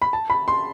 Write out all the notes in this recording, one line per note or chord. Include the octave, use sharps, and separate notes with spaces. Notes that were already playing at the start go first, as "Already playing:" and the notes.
B5
A5
B5
C6